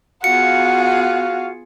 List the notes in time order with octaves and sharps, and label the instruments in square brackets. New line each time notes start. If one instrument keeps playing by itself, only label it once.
[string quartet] B3 F4 G#4 [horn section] F#4 F5 [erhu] F#5 [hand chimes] C#7